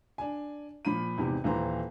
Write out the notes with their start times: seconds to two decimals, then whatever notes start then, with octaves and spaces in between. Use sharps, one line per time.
0.18 D4 G#5
0.85 A#2 F3 B5 D#7
1.18 E2 G#2 C3
1.44 D#1 E3 C5 A#5